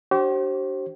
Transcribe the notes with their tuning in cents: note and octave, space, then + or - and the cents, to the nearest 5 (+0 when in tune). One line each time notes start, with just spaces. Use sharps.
D4 +0 G4 -40 C5 +30